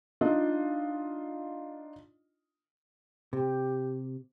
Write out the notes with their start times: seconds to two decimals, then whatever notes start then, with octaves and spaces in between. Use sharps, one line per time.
0.21 D4 D#4 F4 D#5
3.33 C3 G4